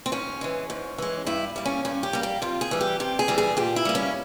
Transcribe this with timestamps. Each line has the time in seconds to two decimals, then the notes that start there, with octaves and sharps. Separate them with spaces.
0.06 C4
0.12 G#2 C#4
0.41 E3 G#3
0.70 G#2
0.98 E3 G#3
1.26 G2 E4
1.56 G3 A#3
1.66 C#4
1.85 G2 C#4
2.03 G4
2.13 G3 A#3
2.23 G4
2.42 C3 F4
2.61 G#4
2.71 E3 G3
2.81 G4
3.00 C3 G4
3.19 G#4
3.28 E3 G3
3.38 G#4
3.57 A#2 G4
3.76 E4
3.85 G3 A#3
3.95 C#4